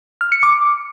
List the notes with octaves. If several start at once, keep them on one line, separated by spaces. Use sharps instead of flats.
F6
C#7
D6